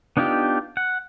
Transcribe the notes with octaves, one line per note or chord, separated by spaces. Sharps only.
B3 D4 D#4 F4 G4
F#5